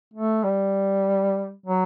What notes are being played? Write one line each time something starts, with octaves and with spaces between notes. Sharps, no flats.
A3
G3
F#3